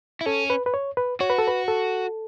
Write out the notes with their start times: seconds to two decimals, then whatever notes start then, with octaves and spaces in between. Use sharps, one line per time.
0.21 E4
0.26 C#4 A4
0.50 B4
0.66 B4
0.74 C#5
0.97 B4
1.20 F#4 C#5
1.30 B4
1.39 A4
1.47 B4
1.68 A4